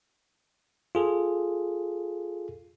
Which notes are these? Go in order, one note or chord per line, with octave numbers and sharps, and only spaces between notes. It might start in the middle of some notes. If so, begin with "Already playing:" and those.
F4 G#4 A4